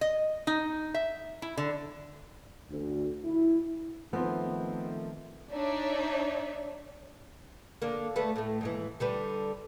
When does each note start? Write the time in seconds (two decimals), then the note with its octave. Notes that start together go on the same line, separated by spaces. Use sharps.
0.01 D#5
0.47 D#4
0.94 E5
1.42 E4
1.57 D3
2.71 D2
3.25 E4
4.13 D#3 F3 A3 B3 C4
5.52 D4 D#4 C#5 D5 E5
7.82 D3 A#3
8.16 D2 A3 B4
8.36 A2 A3
8.61 D#2 G#2 E3
9.00 D3 G3 B4